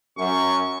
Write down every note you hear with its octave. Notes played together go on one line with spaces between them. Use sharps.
F#2 C#6